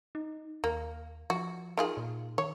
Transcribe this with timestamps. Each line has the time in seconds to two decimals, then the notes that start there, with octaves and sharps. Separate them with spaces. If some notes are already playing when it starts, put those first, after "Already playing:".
0.15 D#4
0.64 D#2 A#3
1.30 F3 F#4
1.77 D#3 F4 G#4
1.97 A#2
2.38 D#3 C#5